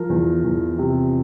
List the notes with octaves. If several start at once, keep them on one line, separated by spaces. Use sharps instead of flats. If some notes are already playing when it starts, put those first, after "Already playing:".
Already playing: F3 A#4
E2
E2
C3